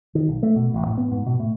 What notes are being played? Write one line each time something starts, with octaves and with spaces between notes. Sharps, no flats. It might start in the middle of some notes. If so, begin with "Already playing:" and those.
D#3
B1
A3
B2
A1
A2
B3
G#2
B2
A2